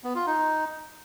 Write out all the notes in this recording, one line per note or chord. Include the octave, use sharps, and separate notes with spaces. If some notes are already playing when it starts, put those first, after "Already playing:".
B3
F4
D#4